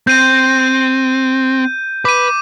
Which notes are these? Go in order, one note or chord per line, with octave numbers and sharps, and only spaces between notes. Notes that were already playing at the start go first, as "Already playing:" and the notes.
C4 G6 D#7
B4 D6 D#7